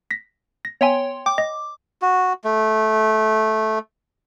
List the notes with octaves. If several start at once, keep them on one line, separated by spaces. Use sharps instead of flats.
A#6 B6
A#6
B3 C#5 E5 G5 G#5 C6
G5 D6
D#5
F#4
A3